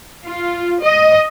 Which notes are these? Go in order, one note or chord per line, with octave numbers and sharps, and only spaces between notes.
F4
D#5